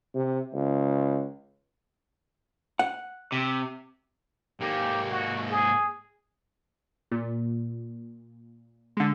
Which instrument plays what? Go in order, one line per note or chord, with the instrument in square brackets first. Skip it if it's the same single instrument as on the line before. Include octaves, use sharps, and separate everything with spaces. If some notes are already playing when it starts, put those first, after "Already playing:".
[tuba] C3
C#2
[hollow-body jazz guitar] F#5
[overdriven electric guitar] C3
[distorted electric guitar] G#2 A#3 [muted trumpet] G4
[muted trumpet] F#4
G#4
[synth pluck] A#2
D3 G#3